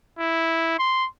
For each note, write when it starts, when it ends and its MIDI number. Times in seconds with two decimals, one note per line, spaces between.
0.19 0.75 64
0.79 1.07 84